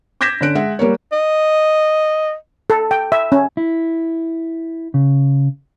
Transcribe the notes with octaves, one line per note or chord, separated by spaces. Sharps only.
D6 G6 G#6 A#6 B6 E7
D3 C#4 F#6 D7
G#3 E5 F#5
G3 A#3 A#4 C#5
D#5
A4
G5
E5
C#4
E4
C#3